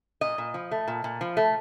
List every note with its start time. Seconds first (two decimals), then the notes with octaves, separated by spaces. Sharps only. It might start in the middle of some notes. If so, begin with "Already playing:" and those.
0.21 A#2 D#5
0.38 A#2
0.54 F3
0.71 A3
0.88 A#2
1.04 A#2
1.21 F3
1.37 A3